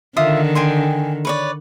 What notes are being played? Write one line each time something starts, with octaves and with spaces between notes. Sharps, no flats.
D3 D#3 F4 E5 D#6
G5 G#5 C6
B4 C#5 D5